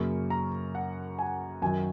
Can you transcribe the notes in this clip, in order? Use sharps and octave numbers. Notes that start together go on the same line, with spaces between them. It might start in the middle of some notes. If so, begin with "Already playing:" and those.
Already playing: F#2 C#3 A#3 C#6
A#5
F#5
G#5
F#2 D#3 F#3 G#5